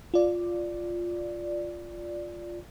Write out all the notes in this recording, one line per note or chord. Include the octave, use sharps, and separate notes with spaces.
F4 D5